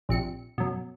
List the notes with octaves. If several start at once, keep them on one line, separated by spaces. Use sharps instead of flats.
A#1 C3 C#7
F#2 B2